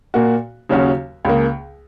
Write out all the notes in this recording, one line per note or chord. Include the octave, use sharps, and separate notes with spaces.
A#2 A#3 F#4
D#2 C#3 F#3 C#4 F#4
C#2 C#3 A#3